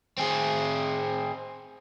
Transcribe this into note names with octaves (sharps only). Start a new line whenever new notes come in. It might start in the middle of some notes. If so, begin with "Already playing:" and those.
C4 G#4